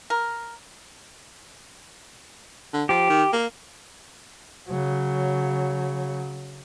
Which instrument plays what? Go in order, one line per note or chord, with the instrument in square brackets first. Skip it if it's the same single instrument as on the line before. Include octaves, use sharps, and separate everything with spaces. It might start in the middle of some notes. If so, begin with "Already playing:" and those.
[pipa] A#4
[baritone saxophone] D3
[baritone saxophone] F3 [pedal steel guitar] G4
[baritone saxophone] D#3
A#3
[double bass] C#3 F#3